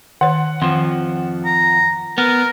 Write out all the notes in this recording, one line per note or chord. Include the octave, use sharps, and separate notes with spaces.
D#3 C#5 F#5
F2 D#3 F3
A#5
B3 A#4